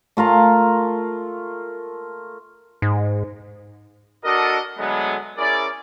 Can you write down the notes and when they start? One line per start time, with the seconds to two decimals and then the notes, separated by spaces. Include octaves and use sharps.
0.17 A3 F4 A#4 A#5
2.82 G#2
4.25 D4 F#4 A4 A#4 D5 D#5
4.78 D3 F#3 G#3 A3 B3
5.38 C#4 E4 G#4 A#4 D5